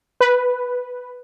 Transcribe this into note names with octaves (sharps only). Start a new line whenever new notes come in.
B4